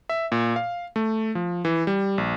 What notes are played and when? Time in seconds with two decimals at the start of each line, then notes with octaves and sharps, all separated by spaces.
0.09 E5
0.32 A#2
0.56 F5
0.96 A3
1.35 F3
1.65 E3
1.87 G3
2.18 A#1